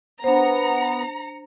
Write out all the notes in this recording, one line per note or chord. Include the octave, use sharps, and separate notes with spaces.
B3 D4 C5 A#5 C#7